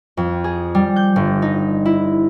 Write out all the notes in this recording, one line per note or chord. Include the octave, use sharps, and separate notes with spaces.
F2
G#4
G3
G6
G1
D#4
E4